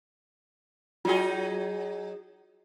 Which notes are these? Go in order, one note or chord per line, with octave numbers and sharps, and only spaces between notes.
F#3 D#4 F4 F#4 G#4